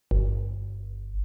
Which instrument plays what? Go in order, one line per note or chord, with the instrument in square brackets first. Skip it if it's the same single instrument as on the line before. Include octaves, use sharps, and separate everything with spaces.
[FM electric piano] G1